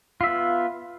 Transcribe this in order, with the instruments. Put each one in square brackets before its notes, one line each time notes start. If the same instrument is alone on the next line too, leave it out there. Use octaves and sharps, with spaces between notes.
[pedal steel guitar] F4
E5
B3